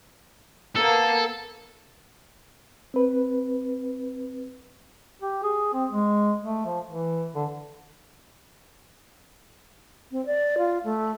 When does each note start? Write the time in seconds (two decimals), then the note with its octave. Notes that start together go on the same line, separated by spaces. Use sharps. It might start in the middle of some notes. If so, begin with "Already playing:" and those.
0.76 A#3 B3 A4
2.94 C4 B4
5.22 G4
5.43 G#4
5.73 C4
5.91 G#3
6.43 A3
6.66 F3
6.88 E3
7.35 D3
10.11 C4
10.26 D5
10.58 F4
10.84 A3